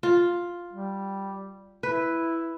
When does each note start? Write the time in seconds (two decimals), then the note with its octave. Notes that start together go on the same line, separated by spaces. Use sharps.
0.03 F4
0.73 G3
1.83 E4 B4